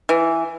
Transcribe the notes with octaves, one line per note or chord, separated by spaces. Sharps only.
E3